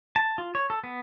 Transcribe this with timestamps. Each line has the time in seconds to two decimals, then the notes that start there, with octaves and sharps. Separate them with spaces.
0.16 A5
0.38 F4
0.55 C#5
0.70 A4
0.84 B3